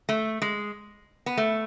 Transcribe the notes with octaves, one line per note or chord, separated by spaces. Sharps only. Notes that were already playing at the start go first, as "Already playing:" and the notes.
A3
G#3
B3
A3